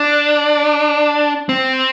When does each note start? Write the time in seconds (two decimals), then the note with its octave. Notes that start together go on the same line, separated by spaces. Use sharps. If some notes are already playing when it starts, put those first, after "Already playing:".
Already playing: D4
1.49 C4